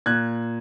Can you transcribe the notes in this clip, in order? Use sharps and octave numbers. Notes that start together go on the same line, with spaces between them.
A#2 F#6 G#6